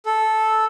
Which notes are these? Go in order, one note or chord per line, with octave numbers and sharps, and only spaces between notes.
A4